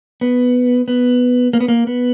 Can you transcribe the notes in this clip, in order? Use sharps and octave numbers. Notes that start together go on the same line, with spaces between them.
B3
B3
A#3
B3
A#3
B3